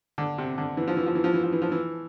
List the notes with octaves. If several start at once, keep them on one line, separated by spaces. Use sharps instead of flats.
D3
C3
D3
E3
F3
E3
F3
E3
F3
E3
F3
E3
F3
E3